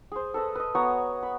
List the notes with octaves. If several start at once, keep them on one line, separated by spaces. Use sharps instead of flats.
G#4 C5
A4 B4 D#5
B4 D#5
B3 F#4 C#5 A#5
B5